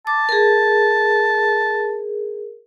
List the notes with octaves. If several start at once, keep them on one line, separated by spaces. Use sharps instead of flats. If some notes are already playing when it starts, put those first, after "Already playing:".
A5 D6
G#4 A#4